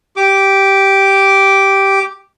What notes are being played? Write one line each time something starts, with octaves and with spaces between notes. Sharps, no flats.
G4 D6